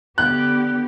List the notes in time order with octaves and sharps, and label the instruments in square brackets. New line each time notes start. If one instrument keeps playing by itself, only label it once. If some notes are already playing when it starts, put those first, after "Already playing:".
[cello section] D3 B3 G4 [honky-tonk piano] F#6